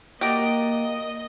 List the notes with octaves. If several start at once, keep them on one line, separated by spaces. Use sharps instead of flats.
A#3 F#4 G4 D5 D#5 A#5 D6